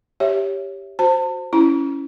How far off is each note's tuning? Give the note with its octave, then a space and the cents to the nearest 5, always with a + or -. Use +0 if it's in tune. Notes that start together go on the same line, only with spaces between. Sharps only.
G4 +0 C#5 +5 E5 +0
F#4 -10 C5 +0 A5 +30
C#4 +5 E4 +0 A#5 +30